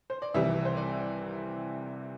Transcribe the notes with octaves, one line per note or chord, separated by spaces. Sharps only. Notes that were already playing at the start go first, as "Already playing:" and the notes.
C5
D5
C2 C3 E3 G3 E5
C5
D5